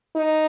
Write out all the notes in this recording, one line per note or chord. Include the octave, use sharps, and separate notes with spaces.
D#4